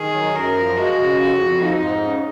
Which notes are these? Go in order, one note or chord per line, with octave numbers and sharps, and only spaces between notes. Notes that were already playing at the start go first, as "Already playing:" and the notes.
Already playing: D#3 G#4
F#3
F#2 A#4
F3
G#3 F#4
C#3
F2
F2
F3 D#4
G#2
C#3